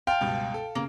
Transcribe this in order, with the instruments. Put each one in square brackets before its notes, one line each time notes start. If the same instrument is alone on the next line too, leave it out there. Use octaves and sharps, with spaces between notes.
[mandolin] F5 A5 [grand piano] G5 [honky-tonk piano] C6
[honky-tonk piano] C#2 G2 B2
A4
[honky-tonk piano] C#3 [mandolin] A#3